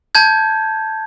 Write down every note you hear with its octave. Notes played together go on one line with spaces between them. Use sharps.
A5 G6 G#6